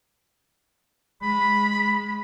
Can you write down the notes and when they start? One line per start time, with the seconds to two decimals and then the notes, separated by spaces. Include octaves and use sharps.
1.22 G#3 B5